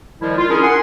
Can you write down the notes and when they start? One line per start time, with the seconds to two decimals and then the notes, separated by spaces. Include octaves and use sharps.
0.21 D#3 F3 G3 G#3 E4
0.37 F4
0.49 C#4 D4 E4 G#4 A#4
0.62 F#5 G#5 C6